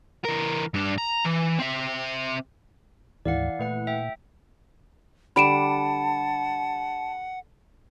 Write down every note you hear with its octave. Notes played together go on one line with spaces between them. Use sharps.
E3 A#4
G2 D4
A#5
E3
C4 E5
D2 G#2 E3 D5 F5 F#5
A#2 A3 B4 F#5
E5 G5
D3 G3 D4 F#5 A5 B5 D7 E7